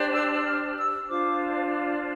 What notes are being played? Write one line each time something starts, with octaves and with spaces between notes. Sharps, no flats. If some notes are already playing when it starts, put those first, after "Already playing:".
Already playing: D4 G4 C5
E6
F6
E6
D4 F4 C5 D6